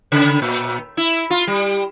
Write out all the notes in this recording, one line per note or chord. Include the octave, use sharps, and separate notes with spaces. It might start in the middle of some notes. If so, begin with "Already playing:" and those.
C#3
A#2
E4
F4
G3